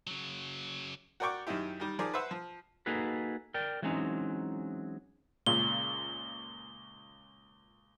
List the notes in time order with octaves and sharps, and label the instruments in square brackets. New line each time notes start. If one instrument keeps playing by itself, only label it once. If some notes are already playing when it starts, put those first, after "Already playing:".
[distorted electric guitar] C#3 F#3
[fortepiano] F#4 A#4 D5 G5 C#6 D6
F#2 D#3 D#4 E4 G4
D#3 G3
D#3 F3 G#4 A#4 D5
B4 C5 E5 F#5
F3
[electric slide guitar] A#3 D#4 F#4 G#4 A4 B4
A#4 D5 G5
E3 F#3 G#3 C4 C#4 D#4
[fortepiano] C#2 A#2 C#3 [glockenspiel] G7